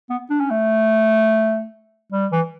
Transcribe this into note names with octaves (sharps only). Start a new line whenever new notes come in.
B3
D4
C#4
A3
G3
E3